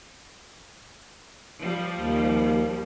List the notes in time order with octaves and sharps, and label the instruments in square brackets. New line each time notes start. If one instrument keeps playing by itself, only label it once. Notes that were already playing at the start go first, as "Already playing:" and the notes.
[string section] F3 G3
[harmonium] D#2